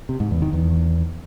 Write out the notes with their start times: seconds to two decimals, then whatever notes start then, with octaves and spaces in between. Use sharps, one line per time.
0.09 C3
0.20 G#2
0.31 E2
0.42 D#3
0.53 E2